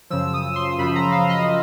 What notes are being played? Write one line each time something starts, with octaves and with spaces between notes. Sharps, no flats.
F#2 C#3 F3 E6
D#6
C6
F#2 C#3 F3 B5
A#5
F5
D#5